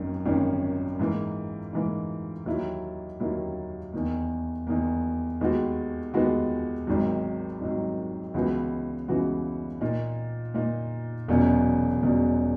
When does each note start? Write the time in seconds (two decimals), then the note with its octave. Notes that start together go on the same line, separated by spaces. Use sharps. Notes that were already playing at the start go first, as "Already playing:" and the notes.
Already playing: G#1 F#2 D#3 A#3 C#4
0.25 G#1 F#2 D#3 A#3 C#4
0.99 G#2 E3 A#3
1.73 G#2 E3 A#3
2.46 D#2 D#3 F#3 A#3 E4
3.20 D#2 D#3 F#3 A#3 E4
3.93 E2 D#3 A#3
4.67 E2 D#3 A#3
5.41 D#2 D#3 G#3 B3 F#4
6.14 D#2 D#3 G#3 B3 F#4
6.87 G#1 G#2 D#3 F#3
7.61 G#1 G#2 D#3 F#3
8.34 C#2 C#3 E3 B3 F#4
9.08 C#2 C#3 E3 B3 F#4
9.81 A#2 A#3 D#4
10.54 A#2 A#3 D#4
11.28 E1 E2 B2 F#3 C#4
12.01 E1 E2 B2 F#3 C#4